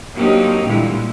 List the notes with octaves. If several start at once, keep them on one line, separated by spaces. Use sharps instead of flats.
F#3 A#3 C4 D4 D#4 G4
A#2 D3 E3 G3 G#3